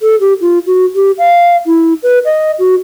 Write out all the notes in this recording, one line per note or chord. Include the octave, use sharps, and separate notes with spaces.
A4
G4
F4
F#4
G4
F5
E4
B4
D#5
F#4